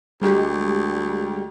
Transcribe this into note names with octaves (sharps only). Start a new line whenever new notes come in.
D2 G3 G#3 G4